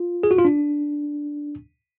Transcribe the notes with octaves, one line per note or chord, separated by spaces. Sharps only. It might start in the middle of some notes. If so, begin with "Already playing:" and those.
Already playing: F4
G#4
F#4
F4
D4